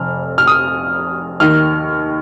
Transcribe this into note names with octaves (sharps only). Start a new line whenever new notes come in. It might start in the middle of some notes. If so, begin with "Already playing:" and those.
Already playing: F1 F2 F6
F6
D#6
D#2 D#3 F6